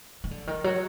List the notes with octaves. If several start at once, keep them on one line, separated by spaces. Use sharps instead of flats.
D#3
D3
D#3
F#3